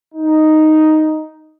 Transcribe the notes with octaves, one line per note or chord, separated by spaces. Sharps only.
D#4